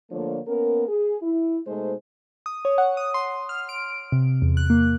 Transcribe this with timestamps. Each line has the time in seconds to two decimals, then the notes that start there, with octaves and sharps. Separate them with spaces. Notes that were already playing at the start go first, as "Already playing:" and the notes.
0.11 D3 F3 A3 A#3 D4 C#5
0.47 A#3 B3 C#4 A#4
0.88 G#4
1.22 E4
1.67 B2 G#3 A3 D#4 C5
2.46 D#6
2.65 C#5
2.78 F#5
2.97 D#6
3.14 C6
3.49 F6
3.69 D7
4.12 C3
4.42 E2
4.57 F#6
4.70 A#3